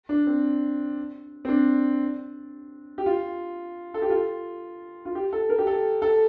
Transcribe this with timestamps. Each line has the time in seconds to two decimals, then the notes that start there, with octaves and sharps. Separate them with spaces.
0.09 D4
0.27 C4
1.45 C4
1.49 D4
2.98 G4
3.06 F4
3.94 A4
4.02 G4
4.10 F4
5.05 F4
5.15 G4
5.33 A4
5.49 A#4
5.59 G4
5.67 A4
6.02 A4